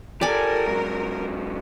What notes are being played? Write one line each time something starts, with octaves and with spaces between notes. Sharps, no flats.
G4 A4 A#4 D5 G#5
G#2 F#3